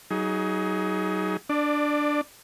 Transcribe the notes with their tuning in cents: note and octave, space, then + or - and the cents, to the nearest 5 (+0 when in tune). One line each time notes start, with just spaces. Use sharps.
F#3 +30 D#4 +30 G#4 +5
D4 +0 D5 +25